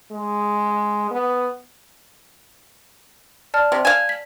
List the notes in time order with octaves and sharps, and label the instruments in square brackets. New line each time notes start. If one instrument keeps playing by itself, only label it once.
[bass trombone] G#3
B3
[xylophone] D5 A5 F6
[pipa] C3
[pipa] F5 G#5 [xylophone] E7
[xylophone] B6